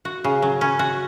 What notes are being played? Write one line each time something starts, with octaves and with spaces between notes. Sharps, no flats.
F#4
C#3
F#3
C#4
F#4